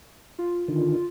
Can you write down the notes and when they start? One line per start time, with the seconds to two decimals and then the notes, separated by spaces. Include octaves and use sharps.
0.39 F4
0.68 D3 D#3